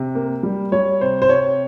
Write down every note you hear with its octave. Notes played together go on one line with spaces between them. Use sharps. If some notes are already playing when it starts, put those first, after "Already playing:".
Already playing: C3
A#3
G3
G3 C#5
C3 C5
C5
C3 C#5